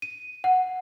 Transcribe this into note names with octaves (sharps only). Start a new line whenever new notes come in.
D#7
F#5